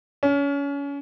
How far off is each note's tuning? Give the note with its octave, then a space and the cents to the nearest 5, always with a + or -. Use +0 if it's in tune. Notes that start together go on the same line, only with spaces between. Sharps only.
C#4 +30